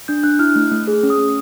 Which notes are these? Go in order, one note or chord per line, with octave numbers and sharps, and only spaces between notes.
D4 G6
D4 F#6
E4 F6
A3
A3
G#4
C#4
D#6
C#4